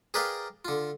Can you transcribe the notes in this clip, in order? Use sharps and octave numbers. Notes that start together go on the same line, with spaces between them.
G#4 A#4 B4 D5 F5 G5
D3 F4